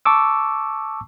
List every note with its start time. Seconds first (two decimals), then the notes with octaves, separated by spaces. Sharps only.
0.05 A5 C#6 D6 E6